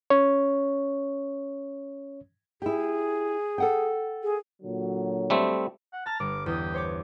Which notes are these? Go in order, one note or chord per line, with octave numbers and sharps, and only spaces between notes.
C#4 C#5
E4 G4 G#4
A4 F#5 G5
G#4
A#2 D3 F#3
G3 A3 C4
F#5
A5 A#5 F6 A#6
G1 D6
E2 G4 D#6
C5 C#5 D6